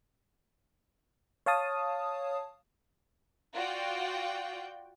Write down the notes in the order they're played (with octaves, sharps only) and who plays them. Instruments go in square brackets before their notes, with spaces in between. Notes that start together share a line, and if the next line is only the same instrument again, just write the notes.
[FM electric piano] C#5 F5 A5 D#6
[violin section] F4 F#4 D5 F#5 G5